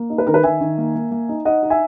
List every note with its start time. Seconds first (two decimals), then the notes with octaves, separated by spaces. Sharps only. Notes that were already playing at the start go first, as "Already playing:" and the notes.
Already playing: A#3
0.10 D#4
0.18 B4
0.27 D#3 A#4
0.34 B4
0.43 D#3 E5 G#5
0.61 D#3
0.78 A#3
0.95 A#3
1.11 A#3
1.29 D#4
1.45 D#4 D#5 F#5
1.63 D#4
1.70 E5 G#5